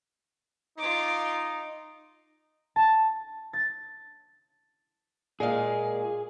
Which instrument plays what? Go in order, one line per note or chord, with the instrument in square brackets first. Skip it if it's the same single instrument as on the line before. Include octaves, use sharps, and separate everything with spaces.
[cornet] D#4 [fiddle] F4 D6
[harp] A5
A6
[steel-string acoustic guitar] A#2 G#3 F5 [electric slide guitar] G#4